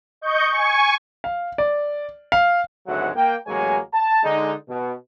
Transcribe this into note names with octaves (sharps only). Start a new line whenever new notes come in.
D#5 C#6 G6
G#5 C#6
F5
D5
F5
G#1 D2 F#3 G#3 E5 F#5
A#3 G5
A1 F#3 G#3 A#3 C#5 G#5
A5
D3 G#3 D#4
B2